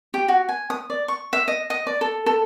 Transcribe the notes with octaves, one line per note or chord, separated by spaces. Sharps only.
G4
F#4
G#5
D#6
D5
C#6
E5
D#5
D#5
D5
A4
A4